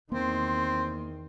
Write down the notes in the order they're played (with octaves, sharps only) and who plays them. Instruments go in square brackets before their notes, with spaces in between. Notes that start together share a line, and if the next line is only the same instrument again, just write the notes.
[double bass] E2 D#3 [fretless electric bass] A#3 [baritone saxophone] C4 [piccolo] C6